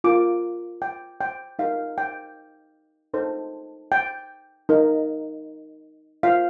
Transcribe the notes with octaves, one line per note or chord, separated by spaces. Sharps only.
F4 A#4 D6
G5
G5
D#4 G4 A#4 F5
G5
D#4 A4 C5
G5
D#4 A#4
F4 C5 F5